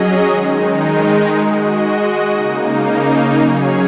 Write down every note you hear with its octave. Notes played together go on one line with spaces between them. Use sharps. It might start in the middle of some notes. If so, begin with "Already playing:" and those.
Already playing: F#3 C#4 G#4 D#5
D#3 G#3 D#4
G#3 F#4 D#5
C#3 A#3 D#4
F#3 C#4 G#4 C#5